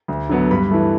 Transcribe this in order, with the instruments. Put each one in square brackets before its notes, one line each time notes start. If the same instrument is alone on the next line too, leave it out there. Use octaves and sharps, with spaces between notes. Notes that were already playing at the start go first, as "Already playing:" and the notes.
[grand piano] D2
D3 F#3 B3
G2 B5
E3 A3